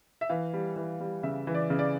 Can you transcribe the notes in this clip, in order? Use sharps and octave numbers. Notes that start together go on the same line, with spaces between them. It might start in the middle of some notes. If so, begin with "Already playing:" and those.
E5
E3 F5
G3
E3
G3
C#3 E5
E3
D5
C#3
D5